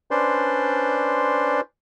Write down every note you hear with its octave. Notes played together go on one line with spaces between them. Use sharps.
C#4 D4 B4 C5 D5 C6